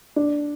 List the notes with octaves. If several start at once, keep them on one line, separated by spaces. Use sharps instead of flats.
D4